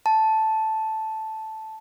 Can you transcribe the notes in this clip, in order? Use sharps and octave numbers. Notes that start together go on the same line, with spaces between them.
A5